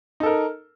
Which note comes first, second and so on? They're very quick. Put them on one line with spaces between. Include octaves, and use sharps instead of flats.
D#4 A4 A#4